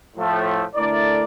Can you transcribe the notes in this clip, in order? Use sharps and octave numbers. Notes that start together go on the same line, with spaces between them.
A2 F3 A3
D3 A3 E4 A#4 D5